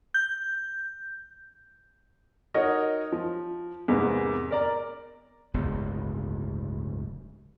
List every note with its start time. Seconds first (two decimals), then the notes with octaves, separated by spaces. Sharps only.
0.14 G6
2.54 D#4 F#4 A#4 C#5 D#5
3.12 F3
3.88 E2 G#2 C3 A#3 B3
4.51 A#4 D5 A#5
5.54 D1 G1 C#2 B3